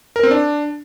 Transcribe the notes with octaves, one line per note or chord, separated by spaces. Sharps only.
A#4
C4
D4